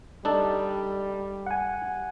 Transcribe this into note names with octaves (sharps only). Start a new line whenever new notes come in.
G3 D4 D#4 A4
F#5 G#5